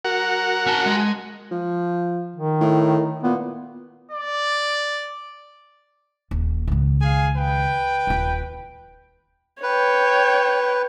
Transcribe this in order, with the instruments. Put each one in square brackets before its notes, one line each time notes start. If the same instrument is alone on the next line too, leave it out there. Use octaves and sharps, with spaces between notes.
[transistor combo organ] F#4 A#4 F#5
[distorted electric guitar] C#4 A5
G#3
[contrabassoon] F3
[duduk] D#3
[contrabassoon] A2
[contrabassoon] A#2 [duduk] B3
[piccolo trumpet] D5
[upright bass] D#1 A#2
C#2 D#3
[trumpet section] G#4 F5 G#5
B4 G5
[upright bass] D#1 F4
[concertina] B4 [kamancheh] C#5 G5